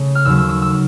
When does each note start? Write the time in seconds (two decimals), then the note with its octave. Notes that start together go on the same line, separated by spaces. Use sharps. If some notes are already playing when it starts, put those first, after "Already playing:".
Already playing: C#3 A3
0.15 F6
0.25 D#2 C#3 F#3 E6
0.38 E6
0.49 E6
0.62 E6